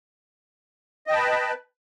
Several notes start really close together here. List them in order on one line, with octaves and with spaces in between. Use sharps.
D#5 G5 A5 B5 B4